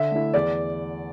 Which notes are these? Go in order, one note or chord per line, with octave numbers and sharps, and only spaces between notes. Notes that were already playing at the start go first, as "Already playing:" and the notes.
Already playing: D3 E5
A3 E4
E2 D5